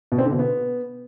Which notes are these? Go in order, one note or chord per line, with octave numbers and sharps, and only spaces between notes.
B2
C4
D3
B2
B3